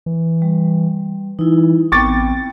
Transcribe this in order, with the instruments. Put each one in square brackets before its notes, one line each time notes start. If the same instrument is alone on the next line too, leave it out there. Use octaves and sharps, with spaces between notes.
[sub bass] E3
[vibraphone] G3
[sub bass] E3 [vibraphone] D#4 E4
[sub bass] A1 [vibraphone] B3 C4 G5 [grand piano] C#6 D6 A6